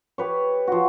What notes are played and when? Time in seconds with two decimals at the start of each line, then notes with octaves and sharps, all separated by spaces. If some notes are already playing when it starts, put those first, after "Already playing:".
0.18 G4 B4 C#5
0.67 F3 F#4